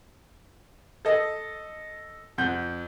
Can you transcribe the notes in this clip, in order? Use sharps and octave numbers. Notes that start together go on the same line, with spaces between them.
A4 D#5
F2 F#5 G6